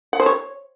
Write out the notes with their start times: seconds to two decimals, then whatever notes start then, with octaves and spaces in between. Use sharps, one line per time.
0.13 F#5
0.20 C5
0.26 C#5